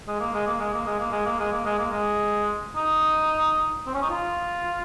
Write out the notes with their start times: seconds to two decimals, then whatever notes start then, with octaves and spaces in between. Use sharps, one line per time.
0.07 G#3
0.20 A#3
0.34 G#3
0.47 A#3
0.60 G#3
0.74 A#3
0.86 G#3
0.99 A#3
1.12 G#3
1.26 A#3
1.39 G#3
1.52 A#3
1.65 G#3
1.79 A#3
1.91 G#3
2.76 D#4
3.87 C4
3.95 C#4
4.02 D#4
4.10 F4